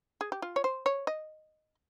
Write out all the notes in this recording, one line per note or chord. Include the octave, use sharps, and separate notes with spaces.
G#4
G4
F4
C#5
C5
C#5
D#5